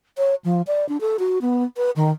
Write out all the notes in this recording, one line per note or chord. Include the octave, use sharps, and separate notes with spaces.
C#5
F3
D5
D4
A4
F#4
B3
B4
D#3